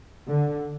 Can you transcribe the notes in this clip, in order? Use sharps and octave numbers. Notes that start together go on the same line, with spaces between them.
D3